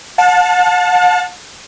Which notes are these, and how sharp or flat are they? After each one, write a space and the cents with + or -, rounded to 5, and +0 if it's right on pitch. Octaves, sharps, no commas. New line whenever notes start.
F#5 -45 A5 +0